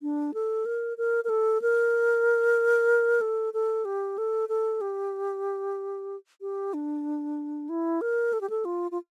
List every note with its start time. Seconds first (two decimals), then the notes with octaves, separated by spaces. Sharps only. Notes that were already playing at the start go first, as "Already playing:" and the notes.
0.02 D4
0.34 A4
0.66 A#4
0.98 A#4
1.24 A#4
1.29 A4
1.62 A#4
3.21 A4
3.54 A4
3.85 G4
4.18 A4
4.49 A4
4.81 G4
6.41 G4
6.74 D4
7.69 E4
8.01 A#4
8.33 A4
8.41 G4
8.50 A4
8.65 F4
8.91 F4